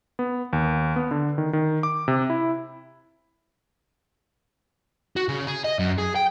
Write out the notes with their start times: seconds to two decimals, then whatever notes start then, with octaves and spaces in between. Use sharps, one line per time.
0.19 B3
0.53 D#2
0.96 B3
1.11 D3
1.38 D#3
1.53 D#3
1.83 D6
2.08 C3
2.30 E4
5.16 F#4
5.29 C#3
5.47 G#4
5.64 D#5
5.79 F#2
5.98 G#4
6.15 G5